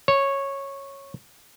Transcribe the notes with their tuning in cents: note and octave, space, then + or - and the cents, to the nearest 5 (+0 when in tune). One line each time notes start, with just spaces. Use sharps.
C#5 -10